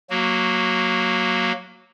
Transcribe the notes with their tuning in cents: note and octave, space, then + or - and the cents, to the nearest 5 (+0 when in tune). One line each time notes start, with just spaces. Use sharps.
F#3 -10 A#3 +0 F#4 +0